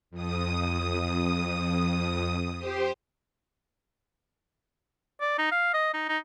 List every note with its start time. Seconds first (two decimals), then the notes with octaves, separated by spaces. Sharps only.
0.11 F2 D#6
2.58 G4 C5
5.21 D5
5.38 D#4
5.51 F5
5.73 D#5
5.94 D#4
6.08 D#4